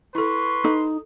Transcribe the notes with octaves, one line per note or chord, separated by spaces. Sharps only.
E4 A4 B4 C6 C#6
D#4 A4